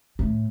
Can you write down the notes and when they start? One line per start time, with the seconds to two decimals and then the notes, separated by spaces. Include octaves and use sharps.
0.19 A2